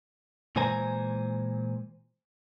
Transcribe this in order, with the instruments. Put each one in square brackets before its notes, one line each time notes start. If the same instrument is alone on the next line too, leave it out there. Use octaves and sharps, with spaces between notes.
[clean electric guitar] A#2 E3 G#3 C5 G#5 A#5